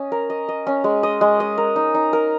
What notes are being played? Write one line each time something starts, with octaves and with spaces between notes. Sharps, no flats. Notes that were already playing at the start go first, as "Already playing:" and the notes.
Already playing: C#4 D#5
A#4
D#5
D#5
C#4
G#3
D#5
G#3
D#5
A#4
D#4
D#4
A#4